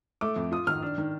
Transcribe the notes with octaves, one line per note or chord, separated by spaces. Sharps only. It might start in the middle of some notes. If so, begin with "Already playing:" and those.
A3 D6
F2
F4 D#6
D#3 F6
D4
D#3